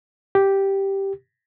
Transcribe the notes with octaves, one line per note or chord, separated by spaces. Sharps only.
G4